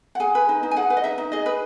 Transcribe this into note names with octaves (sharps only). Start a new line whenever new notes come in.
F#5
G#4 G#5
B4
D#4
D#4
G#5
G#4 F#5
B4
D#5
D#4 E5
D#4
G#4 D#5
B4